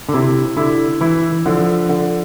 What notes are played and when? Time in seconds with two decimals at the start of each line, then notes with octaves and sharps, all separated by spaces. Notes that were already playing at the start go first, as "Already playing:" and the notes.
0.09 D3
0.13 C3 E4
0.57 D3 E4
1.01 E3 E4
1.46 D3 F3
1.89 D3